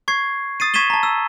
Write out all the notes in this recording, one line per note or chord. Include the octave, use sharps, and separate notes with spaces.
C#6 G#6 C7
D#6 A6 C7 D#7
C#6 G#6 B6 D#7 E7 G7
A5 A#5
E6